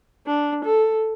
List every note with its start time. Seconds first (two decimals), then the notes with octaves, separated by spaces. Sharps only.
0.27 D4
0.65 A4